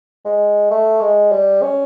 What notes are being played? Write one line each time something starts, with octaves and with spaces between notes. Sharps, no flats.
G#3
A3
G#3
G3
C#4